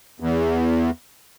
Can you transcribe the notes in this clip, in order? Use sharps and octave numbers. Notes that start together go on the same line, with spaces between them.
E2